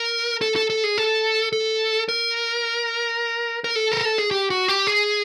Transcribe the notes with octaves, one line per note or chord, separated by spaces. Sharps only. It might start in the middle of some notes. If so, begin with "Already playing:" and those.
Already playing: A#4
A4
A4
A4
G#4
A4
A4
A#4
A#4
A4
A#4
A4
G#4
G4
F#4
G4
G#4